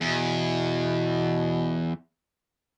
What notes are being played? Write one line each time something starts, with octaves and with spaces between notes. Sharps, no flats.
E2 B2